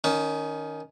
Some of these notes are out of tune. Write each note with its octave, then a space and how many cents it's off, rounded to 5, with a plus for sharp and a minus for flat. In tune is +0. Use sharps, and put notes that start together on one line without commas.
D#3 +0 C#4 +20